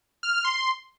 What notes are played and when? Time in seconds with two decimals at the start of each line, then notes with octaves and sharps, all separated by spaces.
0.23 F6
0.34 F6
0.44 C6